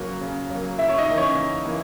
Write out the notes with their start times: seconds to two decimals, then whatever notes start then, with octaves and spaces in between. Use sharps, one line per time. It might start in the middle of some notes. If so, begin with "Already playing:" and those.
Already playing: C#3 F#3 A#3 F#4
0.21 C#3
0.50 F#3 A#3
0.78 C#3 E4 E5
0.89 C#5
0.98 D#4 D#5
1.08 E3 A#3
1.17 C#4 C#5
1.37 C#3
1.65 E3 A#3